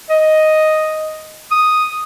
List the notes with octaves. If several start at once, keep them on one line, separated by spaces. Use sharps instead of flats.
D#5
D#6